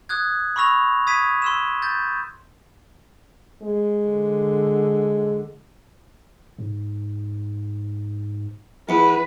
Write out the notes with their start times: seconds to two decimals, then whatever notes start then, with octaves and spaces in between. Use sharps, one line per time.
0.09 D#6 F#6 G#6
0.56 B5 C#6 E6 A#6 F7
1.07 D#6 G#6 B6 D#7
1.42 C6 E6 E7
1.82 G6 A6
3.62 G#3
4.05 D3
6.59 G#2
8.89 E2 B4